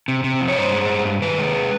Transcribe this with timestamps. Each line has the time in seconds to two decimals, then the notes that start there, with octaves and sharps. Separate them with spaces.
0.08 C3
0.24 C3
0.41 F2
0.48 C#5
0.56 G2 C5
0.73 G#3
0.89 G2
1.05 G2
1.22 D#3 B4
1.39 G#3